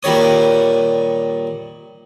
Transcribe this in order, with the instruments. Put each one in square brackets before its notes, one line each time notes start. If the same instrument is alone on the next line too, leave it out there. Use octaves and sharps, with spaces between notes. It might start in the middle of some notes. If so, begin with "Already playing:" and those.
[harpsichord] A#2 D#3 G3 C#5 D#6